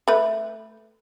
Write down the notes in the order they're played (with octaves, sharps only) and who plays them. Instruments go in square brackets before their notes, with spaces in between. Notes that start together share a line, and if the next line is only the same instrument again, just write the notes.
[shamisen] A3 B4